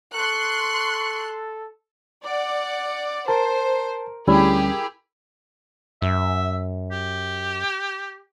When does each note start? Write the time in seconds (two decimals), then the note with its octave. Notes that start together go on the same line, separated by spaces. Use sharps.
0.14 A4 C6 C#6 F#6
2.25 D5 F#5
3.28 A#4 C5 A5
4.27 D2 G3 C#4 E4 G4 G#4
6.02 F#2 E5
6.92 G4